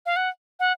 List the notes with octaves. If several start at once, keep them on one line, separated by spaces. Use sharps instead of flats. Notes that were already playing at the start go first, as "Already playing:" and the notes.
F5
F#5
F#5